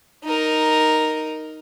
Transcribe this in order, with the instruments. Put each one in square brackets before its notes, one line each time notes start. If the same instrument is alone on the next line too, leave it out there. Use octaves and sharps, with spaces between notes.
[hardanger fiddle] D#4 A#4